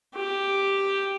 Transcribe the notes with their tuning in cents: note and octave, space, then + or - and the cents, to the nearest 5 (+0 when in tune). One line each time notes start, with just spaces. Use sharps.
G4 +0